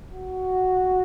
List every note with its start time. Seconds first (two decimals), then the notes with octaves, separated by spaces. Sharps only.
0.11 F#4